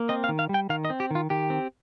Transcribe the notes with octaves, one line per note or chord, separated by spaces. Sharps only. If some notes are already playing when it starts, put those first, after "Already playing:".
Already playing: A#3
C4 D#5
F5
D#3
F5
G3 G5
D#3 F5
D#5
C4
G4
D#3 F4
D#3 G4
C4